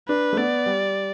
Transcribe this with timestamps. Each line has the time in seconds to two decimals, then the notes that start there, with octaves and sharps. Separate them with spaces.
0.08 D4 B4
0.33 A3
0.38 B3 D5
0.66 G3